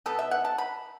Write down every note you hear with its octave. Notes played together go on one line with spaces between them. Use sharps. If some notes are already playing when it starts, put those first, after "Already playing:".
B2 B3 A4
E5
F#5
A5
B5